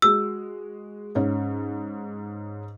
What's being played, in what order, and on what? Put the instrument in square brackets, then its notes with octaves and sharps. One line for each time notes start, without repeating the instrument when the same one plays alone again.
[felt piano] G#3 F#4 [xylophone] E6
[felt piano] G#2 C#4